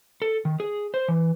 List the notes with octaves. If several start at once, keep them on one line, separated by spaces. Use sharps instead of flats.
A4
D#3
G#4
C5
E3